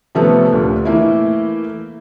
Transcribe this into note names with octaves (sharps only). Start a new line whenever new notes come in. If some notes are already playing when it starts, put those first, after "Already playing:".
C3 F3 A3 B3 C#4 A4
D2 A#2
E3 A3 A#3 E4